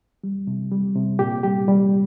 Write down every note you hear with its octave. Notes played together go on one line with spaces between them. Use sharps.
G3
C3
G3
C3
A#2 G4
G3 G4
G3